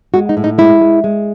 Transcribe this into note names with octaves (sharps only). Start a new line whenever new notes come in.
G#3 F#4
D#4
A2
D#4
G#3 E4
G#3
G#3